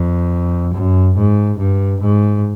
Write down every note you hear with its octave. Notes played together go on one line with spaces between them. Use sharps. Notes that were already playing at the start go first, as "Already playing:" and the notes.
Already playing: F2
F#2
G#2
G2
G#2